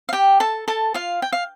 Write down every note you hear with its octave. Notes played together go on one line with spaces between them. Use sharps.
F5
G4 G5
A4 A5
A4 A5
F4 F5
G5
F5